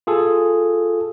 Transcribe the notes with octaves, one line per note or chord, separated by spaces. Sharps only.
F4 G#4 A4